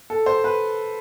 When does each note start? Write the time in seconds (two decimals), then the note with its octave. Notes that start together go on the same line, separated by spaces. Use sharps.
0.10 A4
0.26 C5
0.44 B4